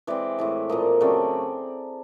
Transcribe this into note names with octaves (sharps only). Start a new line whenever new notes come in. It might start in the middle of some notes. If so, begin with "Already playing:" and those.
E3 G#3 C4 D5
A2 E3 G#3
A#2 F3 A#3 D#5
C#3 F#3 A3 C4 D5